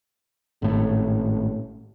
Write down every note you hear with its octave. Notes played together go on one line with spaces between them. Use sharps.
G#1 A2